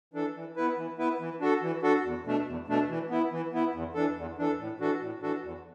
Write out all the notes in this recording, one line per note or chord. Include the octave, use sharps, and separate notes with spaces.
E3 D4 A4
E3
B3 E4 B4
E3
B3 E4 B4
E3
D4 F#4 A4
E3
D4 F#4 A4
E2
B2 A3 D4
E2
B2 A3 D4
E3
B3 E4
E3
B3 E4
E2
E3 D4 A4
E2
E3 D4 A4
A2
E3 D4 F#4 A4
A2
E3 D4 F#4 A4
E2